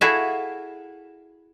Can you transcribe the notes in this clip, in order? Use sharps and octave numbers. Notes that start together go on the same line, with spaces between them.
E4 F#4 G#4 A4 E5 F5